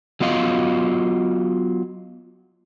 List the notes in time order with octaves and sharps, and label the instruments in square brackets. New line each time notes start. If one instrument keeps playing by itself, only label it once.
[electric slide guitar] F#3 B3 F4 D#5 F5